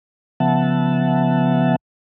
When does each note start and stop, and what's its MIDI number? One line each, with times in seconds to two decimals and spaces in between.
0.40 1.76 49
0.40 1.76 53
0.40 1.76 59
0.40 1.76 76
0.40 1.76 78
0.40 1.76 81